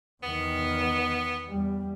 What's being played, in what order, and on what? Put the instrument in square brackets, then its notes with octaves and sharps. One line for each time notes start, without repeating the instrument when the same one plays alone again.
[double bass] E2 D#3 [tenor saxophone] B3
[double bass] E2 G3